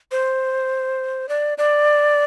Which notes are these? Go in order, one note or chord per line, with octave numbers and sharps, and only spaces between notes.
C5
D5
D5